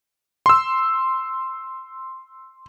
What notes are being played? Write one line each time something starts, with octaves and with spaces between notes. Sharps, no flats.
C6 E6